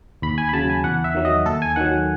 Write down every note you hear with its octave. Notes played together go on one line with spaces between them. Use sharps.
D#2 B5
G#5
B5
C#3 F#3 A5
G#5
E2 F#5
E5
D#3 F#3
D#5
D#2 A4
G#5
D#3 F#3 F#5